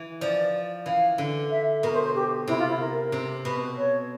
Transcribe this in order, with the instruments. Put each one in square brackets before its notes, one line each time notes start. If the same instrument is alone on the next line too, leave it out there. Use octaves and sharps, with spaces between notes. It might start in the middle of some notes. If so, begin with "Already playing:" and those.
Already playing: [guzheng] E3
[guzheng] F3 [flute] D5
[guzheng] E3 [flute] F5
[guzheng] D3
[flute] E5
[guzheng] B2 [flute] A#4
[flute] C5
C5
G4
[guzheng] C3 [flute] E4
[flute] F4
E4
A#4
[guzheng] C3
[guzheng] B2 [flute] B4
[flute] C#5